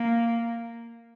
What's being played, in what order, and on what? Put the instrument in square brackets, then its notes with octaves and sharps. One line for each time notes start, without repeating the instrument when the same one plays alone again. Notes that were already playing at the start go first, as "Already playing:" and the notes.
Already playing: [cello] A#3